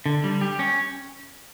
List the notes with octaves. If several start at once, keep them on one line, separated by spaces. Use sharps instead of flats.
D3
G3
G4
C#4